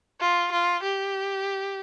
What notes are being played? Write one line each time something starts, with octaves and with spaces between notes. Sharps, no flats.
F4
F4
G4